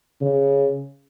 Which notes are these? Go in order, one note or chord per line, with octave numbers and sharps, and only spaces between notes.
C#3